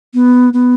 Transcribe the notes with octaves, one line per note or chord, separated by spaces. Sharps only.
B3
B3